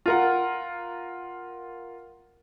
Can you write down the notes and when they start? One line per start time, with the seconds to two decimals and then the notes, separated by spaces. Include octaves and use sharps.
0.06 F4 A#4 F#5